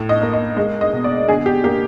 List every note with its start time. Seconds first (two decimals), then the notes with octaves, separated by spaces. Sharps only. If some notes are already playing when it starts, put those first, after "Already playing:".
Already playing: A2
0.09 D#5
0.21 A#3
0.33 D#5
0.57 G#3 D#5
0.81 D#5
0.93 B2
1.04 D5
1.28 D3 G#4
1.46 G4
1.64 A#3 G4